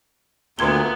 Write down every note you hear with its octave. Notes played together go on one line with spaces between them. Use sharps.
D2 A#2 B3 C6 G#6 G7